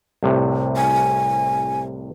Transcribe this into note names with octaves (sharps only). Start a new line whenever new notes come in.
C2 A2 C3
G#5